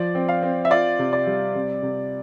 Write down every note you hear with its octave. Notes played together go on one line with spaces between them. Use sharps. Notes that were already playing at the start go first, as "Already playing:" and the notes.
Already playing: F3 D5
C4
F5
C4
E5
F4 D5
C3
D5
G3
C3
C3